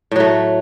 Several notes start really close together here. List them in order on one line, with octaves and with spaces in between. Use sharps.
A2 F#3 A3